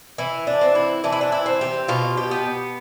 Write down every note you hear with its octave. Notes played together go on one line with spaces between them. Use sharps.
E3 E4
D4
C4
E4
E3 D4
E4
D4
E4
C4
G4
B2 F4
G4
B3